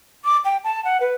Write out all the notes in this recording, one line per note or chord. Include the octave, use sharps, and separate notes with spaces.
D6
G5
A5
F#5
B4